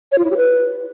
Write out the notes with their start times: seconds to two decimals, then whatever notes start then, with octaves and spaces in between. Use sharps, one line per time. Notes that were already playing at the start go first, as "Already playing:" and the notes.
0.12 C#5
0.18 F4
0.25 E4
0.31 G4
0.37 B4